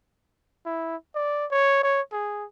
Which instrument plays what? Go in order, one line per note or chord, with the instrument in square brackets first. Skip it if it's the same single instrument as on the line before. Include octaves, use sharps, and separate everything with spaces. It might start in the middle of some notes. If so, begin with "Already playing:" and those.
[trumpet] E4
D5
C#5
C#5
G#4